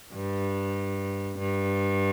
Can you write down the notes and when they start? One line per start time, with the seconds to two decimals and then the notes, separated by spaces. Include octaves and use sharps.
0.14 G2
1.39 G2